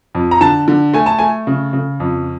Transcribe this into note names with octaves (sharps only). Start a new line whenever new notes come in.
F2
A#5
D3 A5
D3
A3 G#5
A5
A3 G#5
C#3
C#3
F2